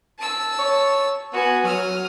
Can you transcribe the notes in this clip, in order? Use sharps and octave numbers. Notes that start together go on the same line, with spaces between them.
A5 E6
C#5
B3 F#4 G#5
F#3 D#6 F6